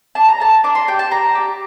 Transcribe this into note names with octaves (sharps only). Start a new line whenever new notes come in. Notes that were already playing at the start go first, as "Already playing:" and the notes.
D4 A5
A#5
A4 A5
D4 D6
C6
G4 G5
A5
D4 A#5
G4